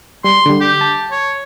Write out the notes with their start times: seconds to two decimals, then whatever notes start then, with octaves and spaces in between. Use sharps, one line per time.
0.24 G3 C6
0.46 D3 G3
0.61 G4
0.81 A5
1.11 C#5